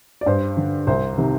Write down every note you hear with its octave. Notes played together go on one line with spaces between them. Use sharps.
D5
G2 C5
D3
C2 C5
C3 D#3